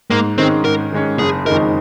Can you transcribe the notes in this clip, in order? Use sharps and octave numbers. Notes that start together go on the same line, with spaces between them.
G#2 A#3
D#3 G#3 C4 C#4
G#2 A#4
D#3 G#3 C#4
F#1 G#4
F2 D#3 G#3 D#4 A#4